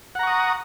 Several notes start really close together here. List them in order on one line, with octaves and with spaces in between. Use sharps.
F#5 A#5 C#6 D#6